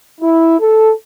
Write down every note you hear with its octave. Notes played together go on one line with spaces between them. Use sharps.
E4
A4